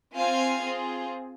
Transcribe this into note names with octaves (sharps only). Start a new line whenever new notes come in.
C4 F4 C5 F5 G#5
C4 F4 G#4